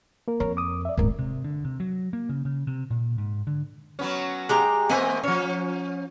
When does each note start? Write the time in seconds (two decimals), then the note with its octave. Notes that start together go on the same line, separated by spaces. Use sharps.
0.28 A#3 A#4
0.40 F2 A#4 C#5
0.57 D6 D#6
0.85 D5 E5
0.97 D#1 G#1 C#2 G2 A#4
1.19 C3
1.44 D3
1.65 C3
1.80 F#3
2.13 A#3
2.29 C#3
2.45 C#3
2.67 C3
2.91 A#2
3.18 G#2
3.47 D3
3.99 F#3 B3 C#4
4.49 G#3 G4 A#5
4.89 E3 A3 A#3 C4 D#5 G#5
5.24 F3 C#4 C#5